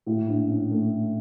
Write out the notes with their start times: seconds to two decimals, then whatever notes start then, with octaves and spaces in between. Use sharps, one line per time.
0.06 A2
0.28 A#1
0.49 C#4
0.71 A3